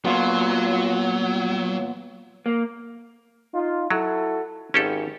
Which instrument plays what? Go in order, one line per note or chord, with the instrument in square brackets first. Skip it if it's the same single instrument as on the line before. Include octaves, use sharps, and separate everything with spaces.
[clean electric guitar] A#2 B3 F4 [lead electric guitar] F#3
[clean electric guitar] A#3
[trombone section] D#4 F4
[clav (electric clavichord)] F#3 [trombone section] E4 F#4 A4
[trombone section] G#1 [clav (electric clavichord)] C#4 G4 A4